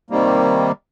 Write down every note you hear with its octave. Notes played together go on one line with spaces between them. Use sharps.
C3 D#3 G3 A#3